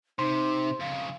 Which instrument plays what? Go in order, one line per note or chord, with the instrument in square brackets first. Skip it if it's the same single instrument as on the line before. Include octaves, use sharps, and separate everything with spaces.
[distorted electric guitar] C3 [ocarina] D#4 [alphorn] C5 [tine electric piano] C6
[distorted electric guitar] F2 C#3 [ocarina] F5